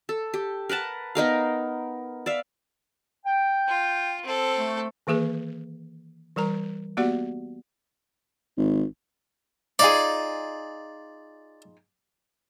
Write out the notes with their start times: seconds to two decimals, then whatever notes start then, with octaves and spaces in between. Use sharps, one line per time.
0.09 A4
0.34 G4
0.69 A#4 B4 F#5 A5
1.15 B3 D#4 A#4 F5
2.26 D5 E5 F5
3.26 G5
3.67 F4
4.23 C4 A4
4.57 A3
5.07 D#3 E3 A#3 G#4 B4
6.36 E3 G3 A#4 A#5
6.97 A#3 B3 F#4 G4 D5 F#5
8.58 G#1
9.79 D#4 F4 G#4 D5